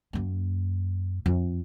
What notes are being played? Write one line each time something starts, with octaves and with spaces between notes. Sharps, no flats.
F#2 A#3
F2